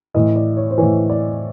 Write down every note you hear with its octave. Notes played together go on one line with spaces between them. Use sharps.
A2 E3 D#5
D5
C#5
C5
A2 E3 C#5
D5